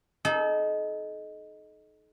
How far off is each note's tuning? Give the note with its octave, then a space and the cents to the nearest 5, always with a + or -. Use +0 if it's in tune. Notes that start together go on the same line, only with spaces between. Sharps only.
D#4 +0 A4 -40